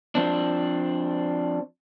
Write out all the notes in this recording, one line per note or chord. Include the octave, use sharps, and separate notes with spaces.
F3 C4 D4